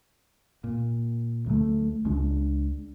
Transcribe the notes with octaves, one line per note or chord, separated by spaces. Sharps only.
A#2
D2 F#3 G#3 A3
C#2 C#3 G#3 D4